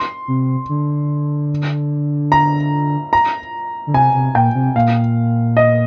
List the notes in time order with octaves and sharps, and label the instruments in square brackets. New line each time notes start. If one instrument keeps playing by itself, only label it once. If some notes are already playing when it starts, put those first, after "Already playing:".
Already playing: [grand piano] C6
[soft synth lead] C3
D3
[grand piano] A#5
A#5
[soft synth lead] D3
[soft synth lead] C3 [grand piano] G#5
[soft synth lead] C3
[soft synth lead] A#2 [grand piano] G5
[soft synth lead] C3
[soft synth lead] A#2 [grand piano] F5
[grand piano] D#5